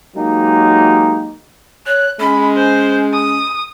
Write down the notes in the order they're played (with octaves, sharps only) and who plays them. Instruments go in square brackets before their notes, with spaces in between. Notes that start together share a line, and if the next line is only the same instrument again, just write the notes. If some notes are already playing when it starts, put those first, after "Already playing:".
[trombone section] F#3 G#3 A#3 D#4 G4
[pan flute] C#5 [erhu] F#6
[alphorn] G#3 [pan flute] C#4 [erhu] B5
[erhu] C5
D#6